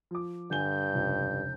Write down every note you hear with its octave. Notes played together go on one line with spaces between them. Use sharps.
F3 D6
G2 D3 G#5 G6 G7
F1 C#2